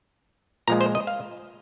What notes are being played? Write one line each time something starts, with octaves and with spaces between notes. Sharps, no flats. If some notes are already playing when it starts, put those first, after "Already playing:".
A#2 F3 G#3 A#5
C5
D#5
F5